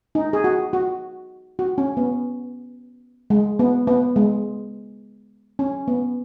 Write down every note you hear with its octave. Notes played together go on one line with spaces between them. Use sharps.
D#4
G#4
F#4
F#4
F#4
C#4
B3
G#3
B3
B3
G#3
C#4
B3